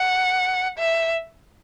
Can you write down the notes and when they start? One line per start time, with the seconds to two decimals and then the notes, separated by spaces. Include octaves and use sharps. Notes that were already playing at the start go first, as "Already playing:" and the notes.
Already playing: F#5
0.79 E5